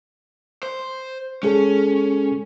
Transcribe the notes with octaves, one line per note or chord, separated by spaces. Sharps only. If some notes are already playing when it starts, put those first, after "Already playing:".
C5
G#3 C#4 G#4 A4